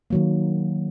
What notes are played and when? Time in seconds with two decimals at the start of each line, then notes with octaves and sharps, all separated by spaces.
0.10 D#3 F#3 A#3